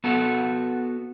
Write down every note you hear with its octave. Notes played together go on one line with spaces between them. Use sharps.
B3 F#4 A4